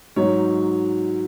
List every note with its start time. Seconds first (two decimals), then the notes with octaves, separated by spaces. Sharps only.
0.16 G#2 F#3 D#4 C#5